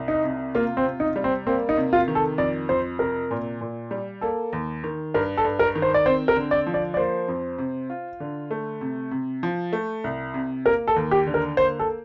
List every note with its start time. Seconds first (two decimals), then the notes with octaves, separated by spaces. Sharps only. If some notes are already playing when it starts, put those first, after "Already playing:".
Already playing: C2
0.08 D#4
0.24 C3
0.55 A#3 F4
0.77 C4
0.85 C3
1.00 D#4
1.16 G3
1.24 C4
1.47 A#3 C4
1.69 D#4
1.77 C3
1.93 F4
2.08 D#3
2.15 A4
2.38 F2 D5
2.69 F2 C5
2.99 C3 A#4
3.31 A#2
3.61 A#2
3.91 G3
4.21 A#3 A4
4.53 D#2
4.84 D#3
5.14 G2 A#4
5.37 A4
5.44 G2
5.59 A#4
5.75 D#3
5.82 C5
5.94 D5
6.06 C4 C5
6.28 A#4
6.37 D3
6.51 D5
6.66 F3
6.74 D5
6.94 D5
6.97 A#3 C5
7.28 F2
7.58 C3
7.90 F4
8.20 D3
8.51 A3
8.81 C3
9.11 C3
9.43 F3
9.73 A3
10.04 C2
10.34 C3
10.65 A#3 A#4
10.88 A4
10.96 D#2
11.11 G4
11.27 D3
11.34 A#4
11.57 A#3 C5
11.79 A4